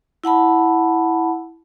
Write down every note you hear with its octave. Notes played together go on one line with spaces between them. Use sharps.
E4 F#5 A5 B5